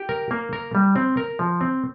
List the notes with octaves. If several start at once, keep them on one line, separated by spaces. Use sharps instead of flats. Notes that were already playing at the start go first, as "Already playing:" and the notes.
Already playing: G4
A#4
A#3
A#4
G3
C4
A#4
F3
C4